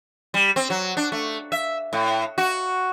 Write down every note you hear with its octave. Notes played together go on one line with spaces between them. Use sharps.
G3
C4
F#3
D4
A3
E5
A2
F#4